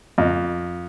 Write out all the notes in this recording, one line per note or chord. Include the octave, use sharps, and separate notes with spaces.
F2